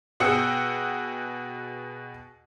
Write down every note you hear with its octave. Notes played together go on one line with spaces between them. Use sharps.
B2 F#4 G#4 G5 E6 C#7